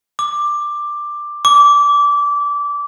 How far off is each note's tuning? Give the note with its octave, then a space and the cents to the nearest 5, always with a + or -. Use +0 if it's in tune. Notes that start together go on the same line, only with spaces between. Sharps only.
D6 +10
D6 -20